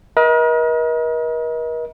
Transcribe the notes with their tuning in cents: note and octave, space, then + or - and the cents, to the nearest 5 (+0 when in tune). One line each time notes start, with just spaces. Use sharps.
A#4 +45 D#5 +35